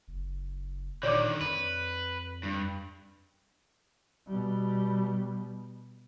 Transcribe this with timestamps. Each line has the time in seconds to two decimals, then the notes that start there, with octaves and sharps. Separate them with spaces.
0.08 F#1
1.03 A#2 D3 D#3 C#5 D5 D6
1.41 F2 B4
2.43 G2
4.28 B2 G3